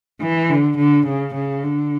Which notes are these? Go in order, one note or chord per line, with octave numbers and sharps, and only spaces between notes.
E3
D3
D3
C#3
C#3
D3